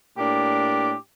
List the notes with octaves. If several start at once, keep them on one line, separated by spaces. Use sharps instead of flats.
A2 A#3 D4 G4